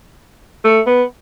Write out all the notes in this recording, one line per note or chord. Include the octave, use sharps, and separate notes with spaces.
A3
B3